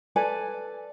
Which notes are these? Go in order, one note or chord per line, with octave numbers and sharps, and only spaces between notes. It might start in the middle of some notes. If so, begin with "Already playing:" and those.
A4 B4 D5 G#5